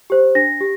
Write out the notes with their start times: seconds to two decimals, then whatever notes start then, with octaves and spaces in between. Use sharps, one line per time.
0.10 G4 C5
0.35 D4 A#6
0.60 G4